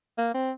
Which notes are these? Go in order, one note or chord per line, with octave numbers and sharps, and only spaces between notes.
A#3
C4